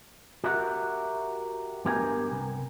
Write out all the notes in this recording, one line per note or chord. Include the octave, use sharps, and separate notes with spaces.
F#4 G4 A#4 E5 F#5
G2 B3 G4 A#4 D#5 G#5
C2